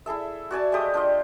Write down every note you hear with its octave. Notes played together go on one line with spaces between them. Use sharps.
E4 G#4 A4 E5
F#4 D5 G#5 A5
G#3 A3 G4 D#6
D4 F4 D#5